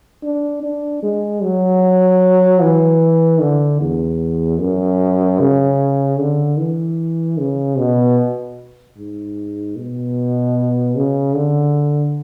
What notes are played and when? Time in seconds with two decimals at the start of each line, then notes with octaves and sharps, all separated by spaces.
0.23 D4
0.63 D4
1.03 G#3
1.43 F#3
2.62 E3
3.41 D3
3.81 E2
4.60 F#2
5.40 C#3
6.19 D3
6.58 E3
7.38 C#3
7.78 B2
8.97 G#2
9.76 B2
10.96 C#3
11.35 D3